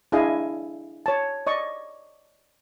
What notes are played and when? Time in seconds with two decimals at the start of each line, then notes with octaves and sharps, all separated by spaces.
0.12 D4 E4 G#4 D#5 F5 G#5
1.06 C#5 A5
1.47 D5 D#5 C#6